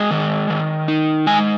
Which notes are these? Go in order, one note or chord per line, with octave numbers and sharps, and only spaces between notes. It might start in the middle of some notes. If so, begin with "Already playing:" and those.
Already playing: G#3 D#5 G5
D#3
D#3
D#4
G#3 G#5